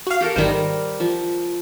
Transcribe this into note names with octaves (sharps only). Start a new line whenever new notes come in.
F#4 F5
G4 A4 A#4
G#1 D#3 G3 A#4 C5
F3